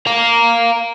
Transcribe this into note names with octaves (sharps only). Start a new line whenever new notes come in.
F5 A#5